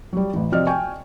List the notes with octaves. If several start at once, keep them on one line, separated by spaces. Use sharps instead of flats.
F#3 G3
A1 E3
C3 F3 F#4 D5 D#5 F6
G5 G#5 C#6